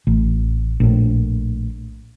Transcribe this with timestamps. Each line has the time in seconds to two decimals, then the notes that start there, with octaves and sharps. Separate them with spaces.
0.07 A1
0.80 A#1 A2